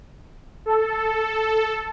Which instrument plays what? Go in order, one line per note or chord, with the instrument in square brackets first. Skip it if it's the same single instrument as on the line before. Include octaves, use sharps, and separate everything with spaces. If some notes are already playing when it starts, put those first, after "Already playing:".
[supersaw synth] A4